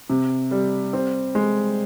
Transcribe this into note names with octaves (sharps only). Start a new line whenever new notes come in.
C3
G3
C4
G#3